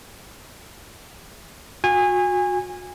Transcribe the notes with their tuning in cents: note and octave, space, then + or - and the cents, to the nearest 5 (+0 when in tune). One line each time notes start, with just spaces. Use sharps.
F#4 -30 G#5 -25